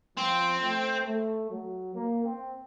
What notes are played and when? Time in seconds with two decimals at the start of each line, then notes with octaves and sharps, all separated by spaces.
0.17 F3 C4
0.61 A3
1.06 A3
1.50 F#3
1.95 A#3
2.24 C4